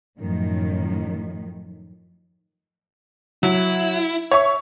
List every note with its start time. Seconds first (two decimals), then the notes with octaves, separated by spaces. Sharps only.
0.18 F#2 A2 D#3 F3
3.43 F#3 E4
4.31 C#5 E5 C#6